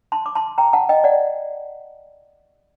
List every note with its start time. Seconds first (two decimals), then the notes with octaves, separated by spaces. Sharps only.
0.12 A5 C6
0.26 D6
0.35 A5 C6
0.58 G5 A#5
0.73 F#5 A5
0.89 D#5 G5
1.04 D5 F#5